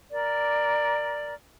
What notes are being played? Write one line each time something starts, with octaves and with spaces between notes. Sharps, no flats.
A#4 D5